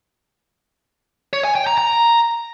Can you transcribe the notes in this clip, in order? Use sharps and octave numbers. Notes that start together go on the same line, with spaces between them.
C#5
G#5
G5
A#5
A#5